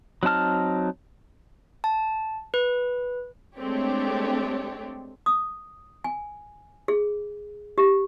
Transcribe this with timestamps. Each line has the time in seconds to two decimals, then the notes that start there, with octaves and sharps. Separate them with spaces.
0.23 F#3 C4 D#4 A5 F6
1.84 A5
2.54 B4
3.57 G#3 A3 C4 D4 G4 C#5
5.26 D#6
6.04 G#5
6.88 G#4
7.78 G4